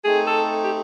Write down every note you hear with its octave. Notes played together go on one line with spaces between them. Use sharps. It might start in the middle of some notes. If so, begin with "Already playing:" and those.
A3 C4 D#4 G#4
A4
G4